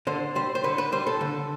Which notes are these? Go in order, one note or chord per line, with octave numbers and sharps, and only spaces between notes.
D3 C5
G3 C5
C5
D3 B4
B4
G3 C5
A4
D3